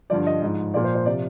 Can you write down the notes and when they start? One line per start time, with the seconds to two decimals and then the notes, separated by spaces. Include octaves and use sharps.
0.10 G2 D3 F3 D5
0.27 D#5
0.42 G#2 F3
0.74 A#2 F3 D5
0.84 C5
0.95 C5
1.06 C3 F3 D5